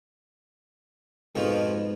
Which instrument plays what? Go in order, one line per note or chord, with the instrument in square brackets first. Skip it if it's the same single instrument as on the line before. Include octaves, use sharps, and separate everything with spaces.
[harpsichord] F2 B2 F3 [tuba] G#2